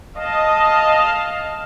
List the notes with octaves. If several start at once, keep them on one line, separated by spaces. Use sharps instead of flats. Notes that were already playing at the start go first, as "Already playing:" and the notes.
D#5 F5 A5